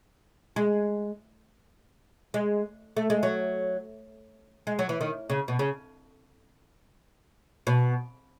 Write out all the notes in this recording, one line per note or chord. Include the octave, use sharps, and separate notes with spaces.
G#3
G#3
A3
G#3
F#3
G#3
F#3
E3
D#3
C#3
B2
C#3
B2